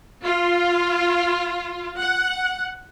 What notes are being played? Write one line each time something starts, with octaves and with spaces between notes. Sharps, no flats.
F4
F#5